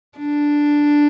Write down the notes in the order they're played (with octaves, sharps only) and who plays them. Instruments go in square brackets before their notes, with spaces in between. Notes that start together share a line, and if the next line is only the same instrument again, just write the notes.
[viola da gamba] D4